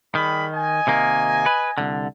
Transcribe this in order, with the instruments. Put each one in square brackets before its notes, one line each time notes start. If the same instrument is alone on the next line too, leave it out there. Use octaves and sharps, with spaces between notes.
[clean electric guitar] D#3 [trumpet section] G3 G#4 B5
[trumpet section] D#5 G#5
[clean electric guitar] C3 D#3 A#3
B4
C2 D3